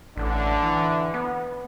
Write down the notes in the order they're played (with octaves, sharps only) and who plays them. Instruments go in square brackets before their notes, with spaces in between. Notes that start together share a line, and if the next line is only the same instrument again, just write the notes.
[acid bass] A1 [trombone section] D3
[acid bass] E3
B3